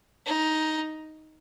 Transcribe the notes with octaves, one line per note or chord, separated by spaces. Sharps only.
D#4